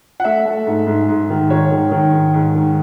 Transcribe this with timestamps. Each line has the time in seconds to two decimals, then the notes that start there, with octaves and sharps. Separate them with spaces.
0.20 F#5
0.24 A3 E5
0.46 A3
0.67 G#2
0.87 G#2
1.09 G#2
1.30 D#3
1.50 G#2 C#5
1.71 D#3
1.91 D#3
2.13 G#2
2.34 G#2
2.55 D#3